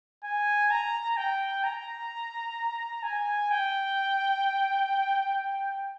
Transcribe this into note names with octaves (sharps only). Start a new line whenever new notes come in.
G#5
A#5
G5
A#5
G#5
G5